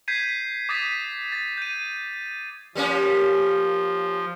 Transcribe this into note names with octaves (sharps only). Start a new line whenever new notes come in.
G6 G#6 B6 C7 D#7
D6 D#6 A6 B6 D#7
A6
G6 D#7
F3 G3 A#3 C#4